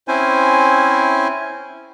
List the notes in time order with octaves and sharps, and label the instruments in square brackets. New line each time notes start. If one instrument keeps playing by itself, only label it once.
[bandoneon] C4 C#4 E4 C5 G#5